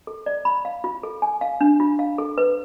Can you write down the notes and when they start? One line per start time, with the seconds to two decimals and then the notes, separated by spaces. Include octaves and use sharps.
0.07 A4
0.26 D5
0.45 B5
0.65 F5
0.84 F4
1.03 A4
1.22 G#5
1.41 F5
1.61 D4
1.80 F4
1.99 F5
2.18 A4
2.38 B4